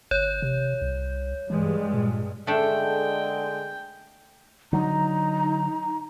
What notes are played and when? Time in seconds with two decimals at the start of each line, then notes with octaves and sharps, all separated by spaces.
0.11 G#1 C#5 G6
0.42 C3
0.82 C2
1.50 G2 E3 G3 G#3
1.94 A#2
2.47 D3 G#3 A3 D4 G5
4.73 D3 F#3 D#4 A#5